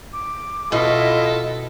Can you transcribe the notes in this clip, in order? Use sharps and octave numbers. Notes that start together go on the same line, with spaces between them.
D6
B2 E4 F4 A4 D#5